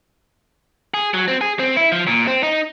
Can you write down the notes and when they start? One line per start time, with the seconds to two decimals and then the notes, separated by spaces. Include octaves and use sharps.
0.94 G#4
1.14 F#3
1.28 C4
1.41 G#4
1.59 C4
1.77 E4
1.92 F3
2.08 A#2
2.27 C4
2.43 D#4